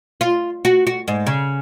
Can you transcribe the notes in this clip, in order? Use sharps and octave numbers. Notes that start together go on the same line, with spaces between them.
F4
F#4
F#4
G#2
C#3